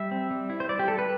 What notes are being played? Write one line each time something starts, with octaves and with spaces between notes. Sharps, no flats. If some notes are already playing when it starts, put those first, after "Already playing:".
Already playing: G3 E5
C4
G3
E4
C5
E4 D5
G4
G3 A4
B4